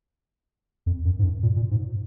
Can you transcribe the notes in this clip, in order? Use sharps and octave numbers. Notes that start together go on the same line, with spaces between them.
F2
F#2
G#2
F#2
A#2
A#2
G#2